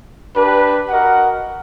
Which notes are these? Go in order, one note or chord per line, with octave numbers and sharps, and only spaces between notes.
D4 G4 B4
F#4 A#4 D#5 F#5